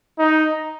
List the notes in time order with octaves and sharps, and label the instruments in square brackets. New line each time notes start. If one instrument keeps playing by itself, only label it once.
[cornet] D#4